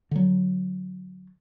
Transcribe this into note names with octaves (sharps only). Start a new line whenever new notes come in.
D3 F#3